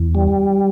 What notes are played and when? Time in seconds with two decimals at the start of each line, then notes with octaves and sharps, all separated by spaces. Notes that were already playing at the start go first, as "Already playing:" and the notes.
Already playing: E2
0.15 G3